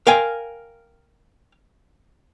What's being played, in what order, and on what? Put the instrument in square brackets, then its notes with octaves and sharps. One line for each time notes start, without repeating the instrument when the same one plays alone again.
[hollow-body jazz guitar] A#4 F5 G5 G#5